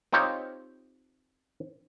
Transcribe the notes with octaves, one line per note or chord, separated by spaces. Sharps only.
C4 D#4 F4 G4 C#5